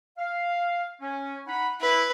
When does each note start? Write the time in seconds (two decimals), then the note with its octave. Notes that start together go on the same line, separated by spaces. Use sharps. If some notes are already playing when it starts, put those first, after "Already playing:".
0.18 F5
1.01 C#4
1.47 D#4 F#5 B5
1.81 E4 B4